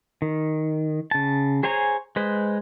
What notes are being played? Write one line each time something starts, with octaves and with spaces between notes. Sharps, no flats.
D#3
C#3 A5
G#4 C5 C#5 G#5 A#5
G#3 B4 C5